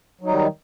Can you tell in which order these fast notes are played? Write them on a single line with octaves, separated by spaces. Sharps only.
F#3 D#4 G3 D#3